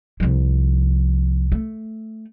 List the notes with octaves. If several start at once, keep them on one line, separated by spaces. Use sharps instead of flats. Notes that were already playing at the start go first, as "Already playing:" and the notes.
C2 F3
A3